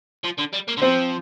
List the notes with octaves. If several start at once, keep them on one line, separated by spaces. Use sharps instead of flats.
F3
D3
G3
A#3
D3
F3 C4 C5